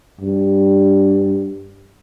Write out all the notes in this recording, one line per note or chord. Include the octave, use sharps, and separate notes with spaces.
G2